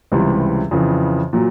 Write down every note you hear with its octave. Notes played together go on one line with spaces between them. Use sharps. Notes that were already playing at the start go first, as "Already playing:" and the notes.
C#2 C3 E3 G3
F2 C#3 E3
A#2 F#3